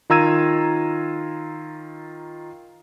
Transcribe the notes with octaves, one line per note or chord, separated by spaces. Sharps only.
D#3 F4 A#5 E6 G#6 D#7